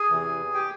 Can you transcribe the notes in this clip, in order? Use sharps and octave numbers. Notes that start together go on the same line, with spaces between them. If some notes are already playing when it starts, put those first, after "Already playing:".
Already playing: G#4 G#5
E2 C3 E3
G4 G5